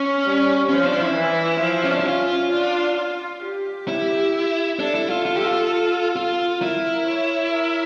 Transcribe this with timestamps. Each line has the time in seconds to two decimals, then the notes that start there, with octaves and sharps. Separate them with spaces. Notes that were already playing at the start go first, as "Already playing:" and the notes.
Already playing: C#4
0.25 G3
0.69 F3 C#4
0.85 D4
1.00 E4
1.15 E3
1.61 F3
1.84 C#4
1.91 D4
1.99 E4
2.06 C#4 F4
2.52 D4
2.98 F4
3.43 G4
3.88 E4
4.79 D4 A4
4.95 E4
5.09 F4
5.25 F4
5.36 G4
5.45 F4
6.16 F4
6.61 E4 A#4
7.07 C#5
7.53 A#4